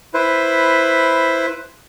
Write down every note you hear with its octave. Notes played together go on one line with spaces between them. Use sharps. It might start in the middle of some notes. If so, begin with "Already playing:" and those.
E4 B4 C5